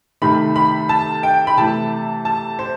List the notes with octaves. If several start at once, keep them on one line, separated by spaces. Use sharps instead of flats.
C3 D#3 A3 B5
B5
A5
G5
B5
C3 E3 A3 A5
A5
C5